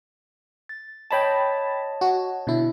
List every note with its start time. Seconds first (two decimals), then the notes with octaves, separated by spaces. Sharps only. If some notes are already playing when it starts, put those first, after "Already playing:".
0.69 A6
1.11 C#5 D#5 G5 A5 B5 A6
2.01 F#4
2.47 B2 D3 E4